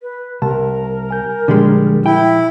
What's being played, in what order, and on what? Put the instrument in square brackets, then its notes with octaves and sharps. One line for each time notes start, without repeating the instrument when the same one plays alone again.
[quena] B4
[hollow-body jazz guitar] C2 [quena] A#4 [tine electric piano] A5
[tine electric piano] G#5 G6
[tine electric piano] A#2 F3 [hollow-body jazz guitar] D3 G3 G#3
[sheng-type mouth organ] E4 [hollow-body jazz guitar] G5